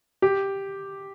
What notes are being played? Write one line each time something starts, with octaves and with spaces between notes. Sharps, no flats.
G4